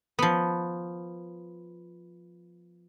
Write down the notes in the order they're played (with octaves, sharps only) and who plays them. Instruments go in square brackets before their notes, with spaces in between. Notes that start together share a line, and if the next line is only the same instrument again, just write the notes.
[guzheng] F3 B3